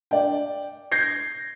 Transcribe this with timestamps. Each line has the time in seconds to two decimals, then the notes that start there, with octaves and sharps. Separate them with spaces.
0.11 D5 G5
0.92 G6 G#6 A#6 C7